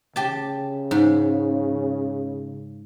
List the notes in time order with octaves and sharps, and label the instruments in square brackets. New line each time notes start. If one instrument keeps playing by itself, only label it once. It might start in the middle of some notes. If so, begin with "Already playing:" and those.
[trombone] C#3 [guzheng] G4 A5
[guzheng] G#2